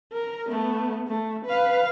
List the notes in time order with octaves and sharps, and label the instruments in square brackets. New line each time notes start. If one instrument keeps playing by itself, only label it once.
[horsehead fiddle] A#4
A3 B3
A3
B4 F5